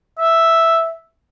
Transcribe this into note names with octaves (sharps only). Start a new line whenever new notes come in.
E5